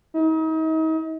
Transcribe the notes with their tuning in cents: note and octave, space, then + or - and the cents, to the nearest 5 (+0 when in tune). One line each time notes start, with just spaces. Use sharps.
D#4 +40